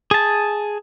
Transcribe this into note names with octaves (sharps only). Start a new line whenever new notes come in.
G#4 A5